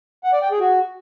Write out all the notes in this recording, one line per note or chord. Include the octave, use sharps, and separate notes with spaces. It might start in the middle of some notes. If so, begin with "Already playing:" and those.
F#5
D5
G5
G#4
F#4